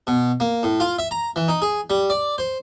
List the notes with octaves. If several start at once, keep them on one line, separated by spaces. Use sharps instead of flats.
B2
A#3
A2
F4
E5
A#5
E3
D#4
G#4
G3
D5
C5